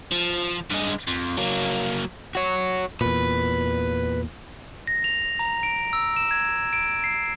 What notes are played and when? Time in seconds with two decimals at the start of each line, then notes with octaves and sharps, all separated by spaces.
0.11 F3
0.70 G2 G#3
1.07 F2
1.37 F#3 A#3
2.35 F#4 C#5
3.01 E2 A#2 B4
4.87 A#6
5.04 F7
5.39 A#5
5.63 D7
5.93 E6
6.16 E7
6.31 G#6
6.73 D7
7.04 C7